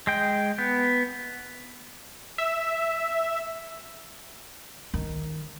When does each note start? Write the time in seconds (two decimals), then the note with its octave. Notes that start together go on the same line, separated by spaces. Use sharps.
0.07 G#3 G5
0.58 B3
2.38 E5
4.94 D#3